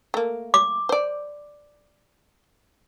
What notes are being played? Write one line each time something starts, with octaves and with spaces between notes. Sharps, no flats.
A3 A#3
D6
C5 D5